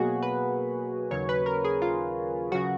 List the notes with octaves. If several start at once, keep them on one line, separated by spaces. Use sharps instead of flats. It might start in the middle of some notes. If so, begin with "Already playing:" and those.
Already playing: B2 F#3 A#3 F#4 G#4
B4
D#2 C#3 F#3 C#5
B4
A#4
G#4
F4
C#3 F#3 F#4